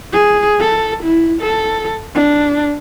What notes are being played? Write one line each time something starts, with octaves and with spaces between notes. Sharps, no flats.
G#4
A4
E4
A4
D4